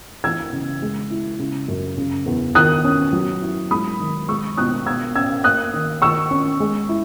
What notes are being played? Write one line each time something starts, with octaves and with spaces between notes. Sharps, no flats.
E3 E6 G#6
C#3
G#3
E4
C#3
F#2
C#3
E2
D#3 D#6 F#6
C#4
F#3
E4
G#3 B5 D#6
D#3
G#3 C#6 E6
B2 D#6 F#6
B2 E6 G#6
C#4 E6 G#6
A#3 D#6 F#6
D#3
D#3 C#6 E6
C#4
G#3
E4